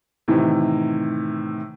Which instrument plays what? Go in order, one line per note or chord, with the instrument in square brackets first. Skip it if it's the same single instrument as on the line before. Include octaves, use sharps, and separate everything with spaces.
[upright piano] A2 C3 D#3 E3